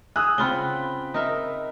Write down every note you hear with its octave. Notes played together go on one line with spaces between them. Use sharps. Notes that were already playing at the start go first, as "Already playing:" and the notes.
G#4 D#6 E6 F#6
C#3 C4 F4 F#5 B5 G7
D#4 A#4 E5